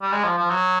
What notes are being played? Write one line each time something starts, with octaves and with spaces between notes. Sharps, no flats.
G3
G#3
F3
F3
F#3